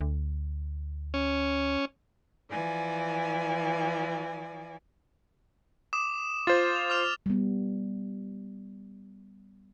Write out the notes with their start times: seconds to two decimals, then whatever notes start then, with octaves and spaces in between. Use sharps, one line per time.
0.01 D2
1.14 C#4
2.50 E3 F3 D5 G#5
5.93 D6 D#6 E7
6.47 F4 C5 A6
6.75 F7
6.90 D6 F6 F7
7.26 G3 B3